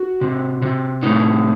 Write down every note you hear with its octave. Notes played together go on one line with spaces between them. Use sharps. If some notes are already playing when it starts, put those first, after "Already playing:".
Already playing: F#4
C3
C3
A2 D#4